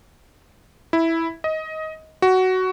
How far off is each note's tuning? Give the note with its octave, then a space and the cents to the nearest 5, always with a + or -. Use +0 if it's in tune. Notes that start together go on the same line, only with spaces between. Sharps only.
E4 -5
D#5 +15
F#4 +10